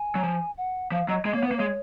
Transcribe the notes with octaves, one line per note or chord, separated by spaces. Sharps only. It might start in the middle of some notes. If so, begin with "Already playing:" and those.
Already playing: G#5
F#3
F3
F#5
F3 F5
F#3 D#5
G#3 D#5
A#3 C#5
B3
A#3 B4
G#3 C#5